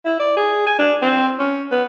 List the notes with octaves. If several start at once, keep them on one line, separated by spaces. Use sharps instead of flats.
E4
D5
G#4
G#5
D4
C4
C#4
B3